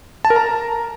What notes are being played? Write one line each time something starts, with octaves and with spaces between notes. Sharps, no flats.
A5
A#4
A#5